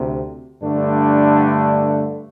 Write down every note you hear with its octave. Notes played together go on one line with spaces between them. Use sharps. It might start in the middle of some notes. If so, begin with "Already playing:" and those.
Already playing: D2 C3
G2 D3 A3 D4